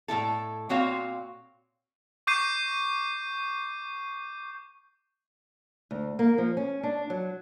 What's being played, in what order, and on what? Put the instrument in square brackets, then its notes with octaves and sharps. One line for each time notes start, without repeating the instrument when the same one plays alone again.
[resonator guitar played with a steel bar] A2 D#3 E4 A4
A#2 C4 F#4 C#5 F5
[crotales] C#6 D6 G6 C7 D#7
[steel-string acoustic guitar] D2
A#3
F3
C#4
D4
F#3